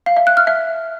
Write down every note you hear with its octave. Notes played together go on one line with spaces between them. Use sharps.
F5
E5
F#6
F6
E5